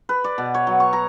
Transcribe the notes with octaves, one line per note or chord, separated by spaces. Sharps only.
B4
D5
B2
C#5
F#3
C#6
A#5